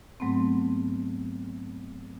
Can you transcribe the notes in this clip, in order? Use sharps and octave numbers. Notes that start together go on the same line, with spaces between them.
G#2 F#3 A3 B3 C4